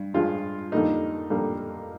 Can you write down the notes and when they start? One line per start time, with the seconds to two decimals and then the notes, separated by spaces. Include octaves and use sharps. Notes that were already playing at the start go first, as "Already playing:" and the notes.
Already playing: G2
0.14 G2 F3 G#3 F4
0.72 F2 D3 G3 A#3 D#4
1.30 F2 D3 G3 A#3